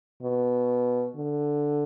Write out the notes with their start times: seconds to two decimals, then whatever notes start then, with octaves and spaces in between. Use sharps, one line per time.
0.23 B2
1.16 D3